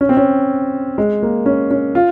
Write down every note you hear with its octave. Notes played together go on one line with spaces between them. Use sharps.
C#4
C4
C#4
G#3
A#3
C#4
C#4
F4